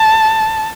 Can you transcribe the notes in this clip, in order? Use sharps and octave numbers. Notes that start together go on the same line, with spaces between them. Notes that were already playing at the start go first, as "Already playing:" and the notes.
Already playing: A5